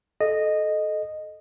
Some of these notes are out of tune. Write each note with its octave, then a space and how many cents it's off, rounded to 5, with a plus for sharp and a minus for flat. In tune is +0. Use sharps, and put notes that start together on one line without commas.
A4 -20 D#5 -10